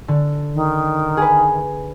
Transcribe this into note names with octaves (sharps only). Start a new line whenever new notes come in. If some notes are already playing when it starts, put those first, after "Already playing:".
D3
D#3
G#4 B4